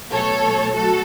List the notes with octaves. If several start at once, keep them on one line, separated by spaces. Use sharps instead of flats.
B2 F#3 A3 A4 C#5
F#3 A3 F#4 A4